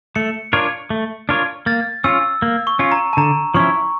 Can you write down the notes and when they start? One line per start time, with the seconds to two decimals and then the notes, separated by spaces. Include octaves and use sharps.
0.15 A3 C#7
0.53 D4 F4 A#4 C#5
0.90 A3
1.29 D4 F4 A#4 C#5
1.66 A#3 A6
2.04 C#4 F4 E6
2.42 A#3
2.67 C#6
2.79 C#4 F4
2.92 A#5
3.13 A5
3.17 D3 A#5
3.54 F3 C#4 E4 C#6